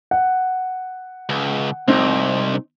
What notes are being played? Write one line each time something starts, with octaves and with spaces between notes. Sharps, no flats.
F#5
C#2
C2 C4 D#4